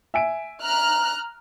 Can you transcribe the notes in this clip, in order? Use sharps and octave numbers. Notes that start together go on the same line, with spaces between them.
E5 G#5 D7
A#5 F6 F#6